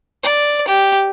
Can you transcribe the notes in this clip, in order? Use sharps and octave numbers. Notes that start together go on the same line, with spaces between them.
D5
G4